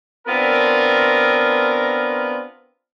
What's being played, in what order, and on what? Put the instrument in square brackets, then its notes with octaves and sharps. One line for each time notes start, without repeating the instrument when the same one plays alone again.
[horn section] B3 C4 D4 F4 A#4